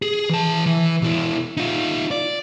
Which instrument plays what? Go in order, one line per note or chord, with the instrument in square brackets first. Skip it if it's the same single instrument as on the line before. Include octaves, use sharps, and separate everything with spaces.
[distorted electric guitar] G#4
E3 A5
E3
B2 E4
D#4 F4
D5